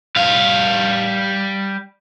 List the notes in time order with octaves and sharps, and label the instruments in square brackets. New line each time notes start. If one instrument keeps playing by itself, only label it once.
[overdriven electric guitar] G3 F5